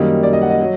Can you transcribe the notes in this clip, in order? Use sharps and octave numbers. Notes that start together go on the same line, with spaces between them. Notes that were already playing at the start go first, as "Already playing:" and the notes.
Already playing: F#2 D#3 G3 A#3 D#4
D5
D#5
F#5
D#5
F#3